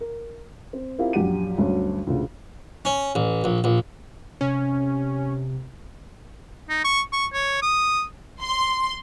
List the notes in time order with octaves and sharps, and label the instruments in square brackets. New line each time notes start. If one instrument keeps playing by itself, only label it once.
[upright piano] A#4
C4
C4 E4 F4 G4 A#4 F5
A#1 F#2 G4 F#5 D#7
D2 G2 F#3 C#4 D4
D2 A#2 C#3
[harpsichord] C#4
A1
A#1
A#1
[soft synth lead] C3 [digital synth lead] C#4
[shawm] D#4
C#6
C#6
C#5
D#6
[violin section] C6